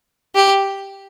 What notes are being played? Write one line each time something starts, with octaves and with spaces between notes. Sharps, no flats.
G4